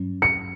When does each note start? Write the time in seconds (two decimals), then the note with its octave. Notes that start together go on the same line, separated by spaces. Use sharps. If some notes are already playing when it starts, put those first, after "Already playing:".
Already playing: G2 F#3 C#4
0.22 C#7